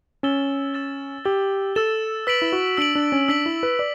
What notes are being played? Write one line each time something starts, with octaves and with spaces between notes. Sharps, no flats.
C#4 E6 A6 E7 G7
E6 A6 E7 G7
G4 E6 A6 E7 G7
A4 E6 A6 E7 G7
B4 E6 B6 D7 F#7
E4
F#4
D4 E6 B6 D7 F#7
D4
C#4
D4 E6 B6 D7 F#7
E4
B4
D5